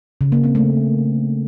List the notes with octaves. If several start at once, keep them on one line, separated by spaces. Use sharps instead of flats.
C#3
A#3
C4
A3